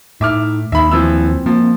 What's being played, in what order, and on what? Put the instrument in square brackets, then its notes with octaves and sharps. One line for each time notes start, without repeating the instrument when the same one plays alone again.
[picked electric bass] A2 [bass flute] D#4 [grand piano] E5 D6 F6
[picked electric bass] D#2 [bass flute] D#4 [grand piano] E5 B5
[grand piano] E3 F3 E6 [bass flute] C4
[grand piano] F3 [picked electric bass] A#3